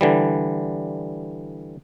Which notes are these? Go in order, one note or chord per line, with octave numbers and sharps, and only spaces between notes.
D3 E3 G3